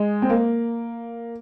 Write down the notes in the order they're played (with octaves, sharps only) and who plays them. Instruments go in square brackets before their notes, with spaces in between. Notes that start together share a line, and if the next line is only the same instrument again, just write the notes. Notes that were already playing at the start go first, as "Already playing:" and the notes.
Already playing: [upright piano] G#3
C4
A#3